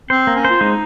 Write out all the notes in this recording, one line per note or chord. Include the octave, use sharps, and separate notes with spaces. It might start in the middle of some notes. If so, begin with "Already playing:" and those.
C4 C5
A#3
C#4
C5
F4
G#3 D#4